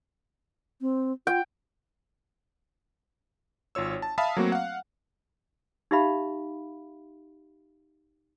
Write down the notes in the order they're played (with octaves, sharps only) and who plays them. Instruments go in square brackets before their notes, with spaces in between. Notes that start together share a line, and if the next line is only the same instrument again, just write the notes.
[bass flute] C4
[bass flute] F4 [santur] G5
[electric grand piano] G#1 F4 C#5 E6
A5
E5 F5 A5 B5 D#6
F#3 A3 A#3 C4 F#4
F5 F#5
[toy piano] D#4 G4 E5 F5 B5